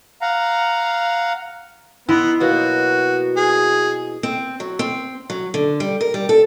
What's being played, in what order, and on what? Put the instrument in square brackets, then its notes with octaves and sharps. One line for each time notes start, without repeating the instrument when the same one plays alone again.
[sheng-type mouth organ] F5 F#5 A#5
[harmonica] B3 [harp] E4 [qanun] D#5 A#5 C6
[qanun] B2 F#3 A#3 [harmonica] F#4
[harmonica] G#4
[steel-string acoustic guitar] C4
F#3
C4
F#3
D3
G3
A#4
G3
A4